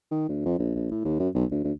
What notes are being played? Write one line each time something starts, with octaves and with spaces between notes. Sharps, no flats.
D#3
D2
F2
A#1
A#1
A2
D#2
F#2
B1
D2
D2